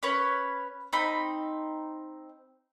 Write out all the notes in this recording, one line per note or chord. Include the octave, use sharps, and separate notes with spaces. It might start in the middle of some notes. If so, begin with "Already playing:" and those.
C#4 B4 C#5
C4 D#4 B5